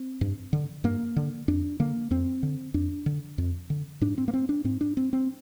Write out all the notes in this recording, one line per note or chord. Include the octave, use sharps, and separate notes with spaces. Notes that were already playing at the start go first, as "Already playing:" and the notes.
Already playing: C4
G2
D3
G2 A#3
D3
F2 D4
D3 A#3
F2 C4
D3
F2 D4
D3
F2
D3
G#2 D4
C4
A#3
C4
D4
G#2 C4
D4
C4
C4